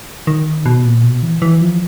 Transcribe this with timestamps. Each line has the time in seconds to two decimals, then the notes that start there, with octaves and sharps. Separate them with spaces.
0.27 D#3
0.66 B2
0.85 A#2
1.04 B2
1.23 E3
1.42 E3
1.61 F3